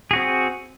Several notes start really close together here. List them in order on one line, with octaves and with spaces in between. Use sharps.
G#4 F#4 C4